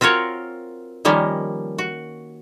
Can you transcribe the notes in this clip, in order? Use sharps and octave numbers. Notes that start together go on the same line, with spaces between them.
C4 F4 F#4 A#4 C#5
D#3 F3 G3 A#3 C#4
F#4